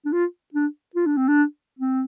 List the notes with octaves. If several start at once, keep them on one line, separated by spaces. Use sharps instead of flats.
D4
F4
D4
F4
D4
C4
D4
C4